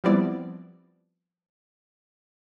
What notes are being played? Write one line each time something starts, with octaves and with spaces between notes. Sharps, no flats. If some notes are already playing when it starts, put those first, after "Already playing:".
F3 G3 B3 C4 E4 D5